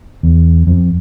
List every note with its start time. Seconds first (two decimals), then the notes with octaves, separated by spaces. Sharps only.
0.23 E2
0.67 F2